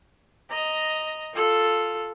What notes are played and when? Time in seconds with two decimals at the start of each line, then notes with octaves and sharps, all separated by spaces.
0.51 D#5 A#5
1.35 F4 A4